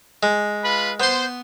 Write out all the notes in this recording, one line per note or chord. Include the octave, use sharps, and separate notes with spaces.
G#3
F4 B4 B5
B3 C5 C6